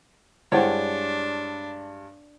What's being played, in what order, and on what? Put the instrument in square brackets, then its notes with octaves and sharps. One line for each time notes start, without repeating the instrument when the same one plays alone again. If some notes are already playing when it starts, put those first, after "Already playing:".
[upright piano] G2 G#3 [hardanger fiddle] D4 [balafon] E4 C5 F#5 [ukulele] C#5 G5